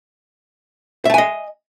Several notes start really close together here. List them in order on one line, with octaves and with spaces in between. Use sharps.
E5 A5 G#5 D#5